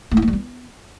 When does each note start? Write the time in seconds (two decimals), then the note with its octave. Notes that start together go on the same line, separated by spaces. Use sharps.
0.11 A3
0.17 E4
0.22 A#3
0.28 G3
0.33 B3